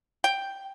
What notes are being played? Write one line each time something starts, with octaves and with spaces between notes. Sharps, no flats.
G5